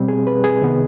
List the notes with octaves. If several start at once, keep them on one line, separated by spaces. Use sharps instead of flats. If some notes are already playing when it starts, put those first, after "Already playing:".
Already playing: B2 G3 C4
G#4
B4
G#4
C2 C3 D#3 B3